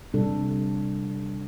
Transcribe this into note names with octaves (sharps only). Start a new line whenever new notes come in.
C3 G3 D4 A4